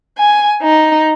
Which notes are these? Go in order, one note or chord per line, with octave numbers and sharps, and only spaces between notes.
G#5
D#4